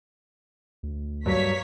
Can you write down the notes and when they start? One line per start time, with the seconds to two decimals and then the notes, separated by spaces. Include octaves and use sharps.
0.83 D2
1.26 G2 F#3 A#3 C#5 B6